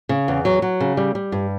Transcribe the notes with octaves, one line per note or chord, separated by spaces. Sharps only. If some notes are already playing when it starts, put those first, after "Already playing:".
C#3
E2
F#3
F#3
C#3
G3
G3
G2